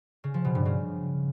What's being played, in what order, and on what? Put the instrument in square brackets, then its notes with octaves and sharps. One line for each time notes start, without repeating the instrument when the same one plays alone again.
[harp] C#3
F3
B2
G2
C#3